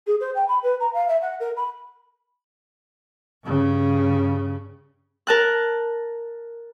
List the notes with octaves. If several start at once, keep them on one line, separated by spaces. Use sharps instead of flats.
G#4
C5
G5
B5
B4
A#5
F5
E5
F#5
A#4
B5
G2 C#3
A#4 A5 F#6